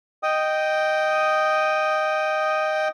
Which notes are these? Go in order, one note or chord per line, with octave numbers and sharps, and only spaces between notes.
D#5 G5 D#6